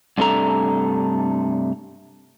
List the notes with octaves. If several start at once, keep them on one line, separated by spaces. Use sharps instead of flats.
G2 C3 A3 D4 A4 A#5